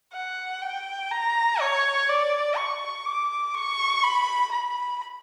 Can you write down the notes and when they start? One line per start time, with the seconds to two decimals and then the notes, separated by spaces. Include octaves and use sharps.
0.13 F#5
0.61 G5
1.11 A#5
1.60 C#5
2.09 D5
2.56 C#6
3.06 D6
3.55 C#6
4.03 B5
4.52 B5